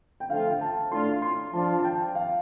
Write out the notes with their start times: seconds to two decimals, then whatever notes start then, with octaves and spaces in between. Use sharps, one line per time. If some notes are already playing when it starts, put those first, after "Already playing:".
0.20 G5
0.30 D3 F3 A3 F4 F5
0.50 G5
0.61 A5
0.91 A2 A3 D4 F4 C6
1.22 C6
1.53 F3 D4 F4 A5
1.79 A5
1.84 G5
2.15 F5